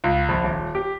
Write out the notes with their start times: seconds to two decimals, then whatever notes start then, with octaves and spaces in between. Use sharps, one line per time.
0.04 C#2
0.29 A#1
0.44 D#1
0.75 G4